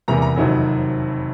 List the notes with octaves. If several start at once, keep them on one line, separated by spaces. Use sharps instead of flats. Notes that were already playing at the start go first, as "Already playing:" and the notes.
E2 C3 E3 G3 A#3 A#5
A#5
F#1 F2 C3 D#3 F#3